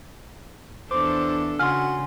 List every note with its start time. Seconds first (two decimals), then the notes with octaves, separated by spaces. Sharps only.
0.91 E2 D4 A4 C5 D6
1.59 C#3 F#4 G#5 C6 F6